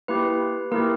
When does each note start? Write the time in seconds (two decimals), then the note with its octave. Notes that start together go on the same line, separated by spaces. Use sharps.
0.08 A#3 E4 G4 B4
0.71 A#3 E4 G4 A#4